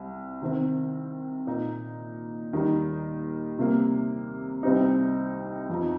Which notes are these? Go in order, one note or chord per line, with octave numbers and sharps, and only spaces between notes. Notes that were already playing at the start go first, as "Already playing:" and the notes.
Already playing: C2 C3
C3 D#3 C4
A#2 A#3 D#4
D#2 D#3 G3 D#4
C3 G3 A#3
C2 C3 G3 C4 D#4
F2 F3 D#4